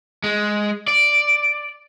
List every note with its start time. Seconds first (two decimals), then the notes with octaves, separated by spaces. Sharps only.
0.24 G#3
0.88 D5